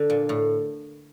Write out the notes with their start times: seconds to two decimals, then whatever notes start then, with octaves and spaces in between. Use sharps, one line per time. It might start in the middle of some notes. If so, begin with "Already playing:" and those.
Already playing: D3
0.10 A#2
0.29 A2